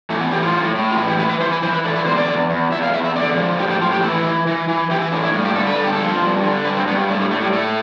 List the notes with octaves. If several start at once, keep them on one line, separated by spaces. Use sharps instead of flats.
E3 A3
B3
A2 G4
F4
A2
A2
F4
E3 E4
G4
E3 B4
B4
E3 C5
B4
E3 C5
B4
D3 A4
B4
E2 C5
D5
E2
E2
E2 E5
F5
E2 E5
E5
D3 D5
F3
A2 G4
G4
A2 F4
G4
E3 E4
E3
E3
E3
E3 G4
E4
A2 D4
E4
G2
G4
D3 A4
B4
G2 A4
G4
A4
F3
G2
D3
G2 B4
C4
G2 B3
G3
A2 A3
G3
A2 A3
G3
A2 A3